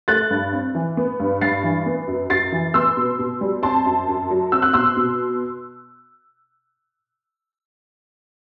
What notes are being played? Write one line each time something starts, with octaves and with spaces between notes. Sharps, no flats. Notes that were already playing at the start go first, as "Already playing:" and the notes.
A3 F#6 A6
G2
C4
E3
B3
G2
G2 A6 C7
E3
B3
F#2
F#2 A6 C7
E3
B3 C6 E6
B2
B2
G3
C4 A5 C6
F#2
F#2
F#3
C4 E6
F#6
B2 C6 E6
B2